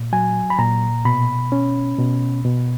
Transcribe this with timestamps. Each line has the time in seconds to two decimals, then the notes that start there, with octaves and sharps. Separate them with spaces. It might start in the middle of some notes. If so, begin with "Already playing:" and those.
Already playing: A#2
0.13 F#3 G#5
0.50 B5
0.58 A#2 A#5
1.05 B2 B5
1.52 C#4
1.98 B2
2.45 B2